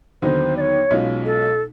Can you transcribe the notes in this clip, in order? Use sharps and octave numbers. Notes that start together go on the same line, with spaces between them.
D#2 D3 F#3 B3 D#4 C5
D5
C#5
B1 B2 G#3 C#4 F4
A4